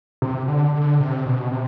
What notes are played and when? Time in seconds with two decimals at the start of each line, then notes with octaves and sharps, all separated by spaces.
0.22 C3
0.48 D3
0.74 D3
1.00 C3
1.26 B2
1.52 C3